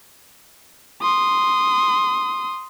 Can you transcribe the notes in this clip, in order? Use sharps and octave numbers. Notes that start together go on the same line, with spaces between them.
C6 D#6